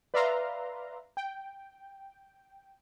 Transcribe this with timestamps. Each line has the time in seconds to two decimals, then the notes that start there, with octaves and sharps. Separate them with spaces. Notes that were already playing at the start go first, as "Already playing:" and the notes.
0.14 B4 D5 E5 F5 A#5 C6
1.17 G5